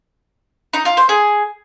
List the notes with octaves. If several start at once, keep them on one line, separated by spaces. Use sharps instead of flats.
D#4
F4
C5
G#4